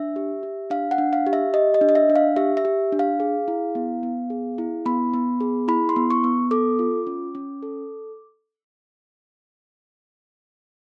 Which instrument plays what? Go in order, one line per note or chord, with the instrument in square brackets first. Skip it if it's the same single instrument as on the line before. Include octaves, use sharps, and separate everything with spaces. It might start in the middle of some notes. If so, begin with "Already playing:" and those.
Already playing: [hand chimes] D4 E5
G4
G4
D4 F5
F#5
D4
F5
G4
E5
G4 D#5
D#5
D4
D#5
E5
D4
F5
G4 E5
E5
G4
D4
F5
G#4
E4
B3
B3
G#4
E4
B3 B5
B3
G#4
E4 B5
C6
B3
C#6
B3
A4 D6
F4
C#4
C#4
A4